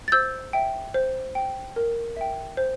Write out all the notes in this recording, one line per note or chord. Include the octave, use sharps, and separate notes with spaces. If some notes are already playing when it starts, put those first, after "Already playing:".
A6
C5 E6 G6
E5 G5
C5
G5
A#4
E5 G5
C5